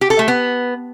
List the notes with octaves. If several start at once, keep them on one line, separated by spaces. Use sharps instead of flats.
G4
A4
A3
B3